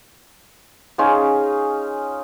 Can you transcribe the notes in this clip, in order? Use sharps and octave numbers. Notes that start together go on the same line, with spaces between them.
C#4 D#4 F4 G#4